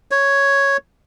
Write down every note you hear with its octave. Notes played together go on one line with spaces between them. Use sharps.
C#5